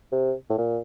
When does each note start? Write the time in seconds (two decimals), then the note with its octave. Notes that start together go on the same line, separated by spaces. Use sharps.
0.12 C3
0.50 A2
0.58 A#2